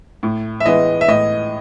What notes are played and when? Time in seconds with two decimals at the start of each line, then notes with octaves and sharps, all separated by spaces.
0.23 A2
0.60 E5
0.66 E3 G#3 B3 E4 D#5
1.01 E5
1.08 A2 D#5